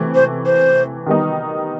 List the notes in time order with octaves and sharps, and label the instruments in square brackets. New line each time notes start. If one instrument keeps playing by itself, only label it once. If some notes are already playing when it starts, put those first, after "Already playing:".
Already playing: [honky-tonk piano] C3 E3 A3
[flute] C5
C5
[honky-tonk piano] D#3 G3 B3 D#4